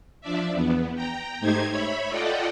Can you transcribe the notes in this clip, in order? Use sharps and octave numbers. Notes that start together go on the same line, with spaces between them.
F3 D4 D5 E5
E2 B3
G5 A#5
G#2 A3 D#4 G4 C5 G#6
C#5 E5 B5
F4 A4 D5 D#5 F#5 G5